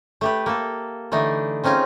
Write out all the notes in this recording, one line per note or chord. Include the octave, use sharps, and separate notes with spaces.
A3 G4 B4
A#3 A4
D3 E3 A3 D4 D#4
C4 C#4 D#4 F4 G#4